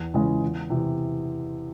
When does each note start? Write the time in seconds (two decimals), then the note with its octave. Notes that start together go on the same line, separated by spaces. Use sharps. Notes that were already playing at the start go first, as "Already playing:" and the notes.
Already playing: E2
0.14 C#3 E3 G#3
0.42 E2
0.70 C3 E3